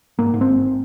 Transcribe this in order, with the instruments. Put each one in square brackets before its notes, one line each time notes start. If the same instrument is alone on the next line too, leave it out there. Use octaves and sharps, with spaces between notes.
[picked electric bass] G#2 A#3
G#2
C4
G#1